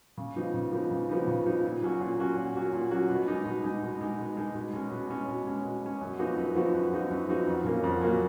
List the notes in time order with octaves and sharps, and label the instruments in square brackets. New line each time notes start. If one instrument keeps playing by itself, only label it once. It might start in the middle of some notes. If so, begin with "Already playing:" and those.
[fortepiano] C#3
F3 B3 D#4
C#3
F3 B3 D#4
C#3
F3 B3 D#4
C#3
F3 B3 D#4
A#2
F#3 C#4 F#4
A#2
F#3 C#4 F#4
A#2
F#3 C#4 F#4
A#2
F#3 C#4 F#4
B2
G#3 D#4
B2
G#3 D#4
B2
G#3 D#4
B2
G#3 D#4
B2
G#3 C#4
B2
G#3 C#4
B2
G#3 C#4
B2
G#3 C#4
F#2
F3 B3 D#4 F#4
F#2
F3 B3 D#4 F#4
F#2
F3 B3 D#4 F#4
F#2
F3 B3 D#4 F#4
F2
C#3 F#3 A#3 C#4
F2
C#3 F#3 A#3 C#4